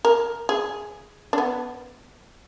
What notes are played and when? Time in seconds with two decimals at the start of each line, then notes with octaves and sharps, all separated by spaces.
0.05 A#4
0.49 G#4
1.33 D4
1.38 B3